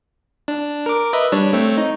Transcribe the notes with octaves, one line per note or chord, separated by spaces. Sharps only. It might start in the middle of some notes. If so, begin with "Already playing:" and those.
D4
A#4 D6
B4 D#5 E5
G3 D4 C#5
A3 C4 C#5
D#4